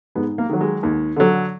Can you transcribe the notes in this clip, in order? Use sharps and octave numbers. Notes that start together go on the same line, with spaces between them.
G#2 G#3 B3
A#3
D#3 F#3
G#3
D#2
D3 F#3